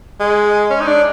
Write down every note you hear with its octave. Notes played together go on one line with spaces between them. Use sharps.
G#3
C#4
D#4
D4